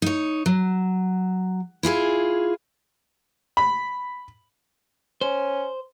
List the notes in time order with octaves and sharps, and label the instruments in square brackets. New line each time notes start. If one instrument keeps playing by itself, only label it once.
[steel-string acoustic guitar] D#4 C#5
F#3
E4 F4 G#4 G#5
[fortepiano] B5
[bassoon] C#4 [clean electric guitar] C5